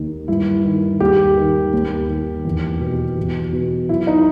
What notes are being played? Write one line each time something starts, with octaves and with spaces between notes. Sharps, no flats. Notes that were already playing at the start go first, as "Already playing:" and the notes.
Already playing: D#2 D#3
G2 E4
D#3
D#2 G4
D#3
D#2
D#3
E2
B2
E2
B2
F#2 E4
D#4